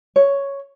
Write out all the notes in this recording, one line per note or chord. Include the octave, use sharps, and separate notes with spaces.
C#5